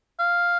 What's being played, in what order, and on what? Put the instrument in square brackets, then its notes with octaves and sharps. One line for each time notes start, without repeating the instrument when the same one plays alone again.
[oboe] F5